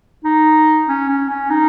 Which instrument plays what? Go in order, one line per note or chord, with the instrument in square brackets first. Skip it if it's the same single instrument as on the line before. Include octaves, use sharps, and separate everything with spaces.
[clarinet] D#4
C#4
C#4
C#4
D#4